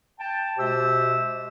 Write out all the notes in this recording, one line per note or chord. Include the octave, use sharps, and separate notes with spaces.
G5 A5
B2 G#3 G4 C5 E5 E6